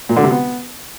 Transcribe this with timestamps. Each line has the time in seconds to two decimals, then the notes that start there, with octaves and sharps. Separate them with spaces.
0.09 A#2
0.16 D3
0.24 C3
0.31 B3